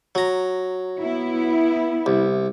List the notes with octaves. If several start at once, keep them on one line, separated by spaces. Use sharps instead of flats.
F#3 A#5
B3 E4
C2